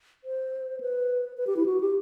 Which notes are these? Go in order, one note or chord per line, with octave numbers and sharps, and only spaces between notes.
C5
B4
B4
G4
E4
F#4
G4